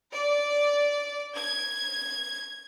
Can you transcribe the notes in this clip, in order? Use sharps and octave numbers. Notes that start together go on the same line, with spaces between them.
D5
G#6